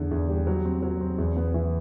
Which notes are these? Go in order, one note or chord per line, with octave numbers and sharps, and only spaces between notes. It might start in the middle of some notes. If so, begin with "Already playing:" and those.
Already playing: E2 D3
E2
G3
F#3
C4
F#3
C4
E2
B3
E3